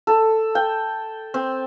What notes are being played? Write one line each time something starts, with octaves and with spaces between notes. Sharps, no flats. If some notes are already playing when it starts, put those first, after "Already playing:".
A4
G5
C4